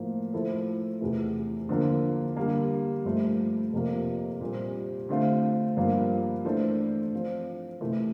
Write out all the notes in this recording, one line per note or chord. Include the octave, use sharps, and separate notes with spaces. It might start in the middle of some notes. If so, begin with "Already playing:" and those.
Already playing: A2 F3 A#3
F3 A3 E4 A4 C5
E2 C3 E3 A3
D3 F3 A#3
D3 G3 A#3
G2 F3 A3
F2 C3 F3 A#3
A#2 G3 C4
D3 A3 C4 F4
G2 F3 A#3 F4
E3 A3 D4 A4 C5
F3 C4 F4 C5
C3 E3 A3